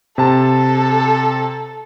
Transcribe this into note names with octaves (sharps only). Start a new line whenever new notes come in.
C3 A4 A5